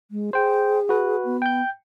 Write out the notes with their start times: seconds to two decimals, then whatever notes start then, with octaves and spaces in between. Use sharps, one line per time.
0.11 G#3
0.33 G#4 C5 G5
0.89 F#4 B4
1.25 B3
1.42 G5 G6